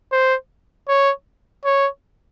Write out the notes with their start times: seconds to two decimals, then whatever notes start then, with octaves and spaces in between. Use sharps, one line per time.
0.12 C5
0.88 C#5
1.65 C#5